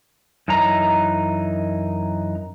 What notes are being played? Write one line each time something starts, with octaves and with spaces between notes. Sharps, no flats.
F#2 E3 D#4 A#5